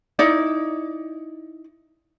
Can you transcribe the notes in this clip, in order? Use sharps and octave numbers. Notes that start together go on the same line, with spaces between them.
D#4 E4 D5